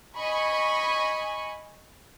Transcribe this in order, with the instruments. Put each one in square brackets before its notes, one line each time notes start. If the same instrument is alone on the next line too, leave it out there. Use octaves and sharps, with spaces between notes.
[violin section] D#5 G#5 B5 C#6